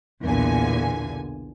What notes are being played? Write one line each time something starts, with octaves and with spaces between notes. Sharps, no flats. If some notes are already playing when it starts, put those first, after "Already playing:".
B1 E2 A#2 D3 G#5